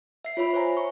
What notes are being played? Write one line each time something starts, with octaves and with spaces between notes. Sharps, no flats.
E5 C7
F4 C#5 E5 B5
C5 C#5 E5 G#5 A#5
A#5 C#6